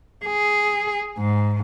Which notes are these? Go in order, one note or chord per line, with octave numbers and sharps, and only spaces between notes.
G#4
G#2